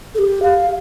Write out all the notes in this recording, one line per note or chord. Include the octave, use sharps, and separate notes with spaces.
A4
G4
F5